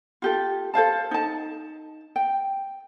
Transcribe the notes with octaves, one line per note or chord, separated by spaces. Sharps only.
F4 G4 A4
A4 C5 F5 A5
D#4 A5
G5